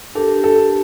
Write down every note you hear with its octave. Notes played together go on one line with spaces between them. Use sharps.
D4 G4 A4 A#4
A4